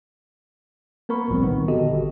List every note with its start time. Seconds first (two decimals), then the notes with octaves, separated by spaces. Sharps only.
1.09 A#3 B3 A#4 B5 C#6
1.28 G1 C2 A2 F3 G3 C4
1.43 A#2 D#3 B3
1.68 D3 F#4 G4 A4 D#5
1.90 G#1